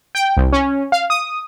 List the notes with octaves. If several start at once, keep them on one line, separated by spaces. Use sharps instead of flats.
G5
C2
C#4
F5
D#6